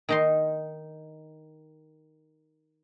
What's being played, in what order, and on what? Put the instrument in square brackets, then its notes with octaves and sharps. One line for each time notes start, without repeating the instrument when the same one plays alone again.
[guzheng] D#3 D#4 C6